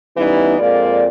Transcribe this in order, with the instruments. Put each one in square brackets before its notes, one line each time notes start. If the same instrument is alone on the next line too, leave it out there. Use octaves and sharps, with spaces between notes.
[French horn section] E3 G3 B3 C#4 D#4 E4
F2 G#3 A#3 F4 D5